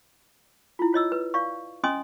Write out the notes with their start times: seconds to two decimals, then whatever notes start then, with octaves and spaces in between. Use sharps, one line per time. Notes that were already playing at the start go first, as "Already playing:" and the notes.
0.79 E4 F4
0.93 F4 C#5 D#5 E6
1.12 B4
1.34 D5 F5 C#6
1.84 C#4 D#5 G#5 C6 D#6